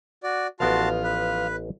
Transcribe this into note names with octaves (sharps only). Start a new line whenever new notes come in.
F#4 D5
A1 F3 B3 F#4 A#4 F5 A5 C6
B4